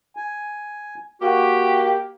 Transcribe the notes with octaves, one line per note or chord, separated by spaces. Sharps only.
G#5
A#3 F#4 G4